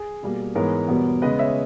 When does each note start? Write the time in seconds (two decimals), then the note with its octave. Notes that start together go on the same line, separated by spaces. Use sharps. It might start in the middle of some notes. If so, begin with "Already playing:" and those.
Already playing: G#4
0.23 B2 G3 A#3
0.55 G#2 E3 G#3 B3 A#4 C#5
0.88 E2 B2 G3 B3
1.22 C#3 G#3 B3 B4 D#5
1.38 C#5 E5